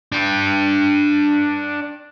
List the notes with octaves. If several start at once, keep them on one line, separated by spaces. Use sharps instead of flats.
D4 G5